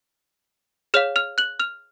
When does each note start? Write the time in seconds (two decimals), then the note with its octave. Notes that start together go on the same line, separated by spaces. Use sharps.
0.94 G#4 C#5 F5 F6 F7
1.16 F6 F7
1.38 F#6 F#7
1.60 F6 F7